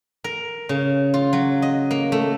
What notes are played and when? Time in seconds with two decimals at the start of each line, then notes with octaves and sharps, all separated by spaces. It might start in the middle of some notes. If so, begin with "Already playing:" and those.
0.24 A#4
0.69 C#3
1.14 F4
1.33 F#3
1.62 D#5
1.91 A#3
2.12 A3